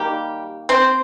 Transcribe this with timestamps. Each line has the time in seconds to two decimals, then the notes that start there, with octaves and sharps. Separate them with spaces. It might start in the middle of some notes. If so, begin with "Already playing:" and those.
Already playing: D#3 G3 A#3 G4
0.69 C4 C5